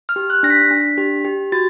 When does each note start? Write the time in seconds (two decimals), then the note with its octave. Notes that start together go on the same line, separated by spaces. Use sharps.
0.09 F6
0.16 G4
0.30 F#6
0.43 D4 A#6
0.50 B6
0.71 D4
0.98 G4
1.25 G4
1.52 F#4 A6